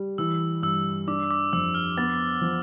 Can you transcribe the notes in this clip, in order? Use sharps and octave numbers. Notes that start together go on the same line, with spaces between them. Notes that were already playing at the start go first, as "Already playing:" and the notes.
Already playing: G3
E3 E6
G2 E6
D4 D6
D6
F2 E6
F6
B3 A6
F3